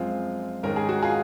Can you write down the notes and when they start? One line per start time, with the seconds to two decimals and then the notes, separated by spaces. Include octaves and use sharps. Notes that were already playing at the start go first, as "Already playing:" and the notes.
Already playing: F#2 F3 G#3 C4 F4
0.63 G#2 D#3 G#3 C#4 A#4
0.76 G#4
0.89 F#4
1.03 F4 G#4